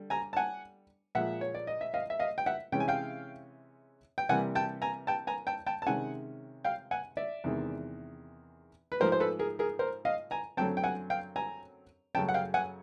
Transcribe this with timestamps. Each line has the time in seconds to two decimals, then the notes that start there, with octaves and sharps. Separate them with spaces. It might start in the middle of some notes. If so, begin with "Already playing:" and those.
Already playing: D3 G3
0.10 G#5 A#5
0.33 A5
0.37 F#5 G#5
1.15 A#2 F3 G#3 E5 F#5
1.41 C#5
1.55 D5
1.67 D#5
1.81 E5
1.94 D#5 F5
2.10 E5
2.19 D#5 F5
2.38 G5
2.46 E5 F#5
2.72 C3 E3 G#3 C#4 G5
2.80 G#5
2.88 F5 G5
4.18 G5
4.29 C3 E3 G3 A#3 F#5 G#5
4.55 G5 A5
4.82 G#5 A#5
5.07 G5 A5
5.27 G#5 A#5
5.47 G5 A5
5.67 G5 A5
5.82 A5
5.86 C3 D#3 G#3 C#4 F#5 G#5
6.64 F5 G5
6.91 F#5 G#5
7.17 D5 E5
7.44 E2 C3 D#3 G#3
8.92 B4
9.00 G#2 F3 A3 A#4 C5
9.12 C5
9.20 A4 B4
9.39 G#4 A#4
9.59 G#4 A#4
9.79 A#4 C5
10.05 D#5 F5
10.31 G#5 A#5
10.57 F#2 D3 F#3 A3 C4 G5 A5
10.77 G5
10.84 F#5 G#5
11.10 F5 G5
11.36 G#5 A#5
12.15 F#2 C#3 F#3 A3 C#4 G5 A5
12.29 F#5
12.34 F5 G5
12.54 F#5 G#5